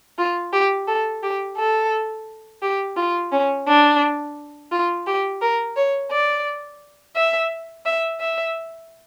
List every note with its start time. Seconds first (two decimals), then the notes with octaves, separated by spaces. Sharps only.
0.18 F4
0.52 G4
0.87 A4
1.23 G4
1.57 A4
2.62 G4
2.97 F4
3.32 C#4
3.67 D4
4.71 F4
5.06 G4
5.41 A#4
5.76 C#5
6.11 D5
7.16 E5
7.86 E5
8.20 E5